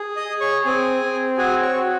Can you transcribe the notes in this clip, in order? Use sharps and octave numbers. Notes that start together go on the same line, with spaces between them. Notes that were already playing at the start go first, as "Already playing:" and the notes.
Already playing: G#4
D#5 D#6
G#4
C#5 C#6
C4 G#4 G#5
C4
F#4 G#4 G#5
C#5 C#6
F#4